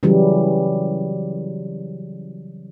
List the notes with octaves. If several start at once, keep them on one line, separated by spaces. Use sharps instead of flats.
C#3 E3 F#3 G3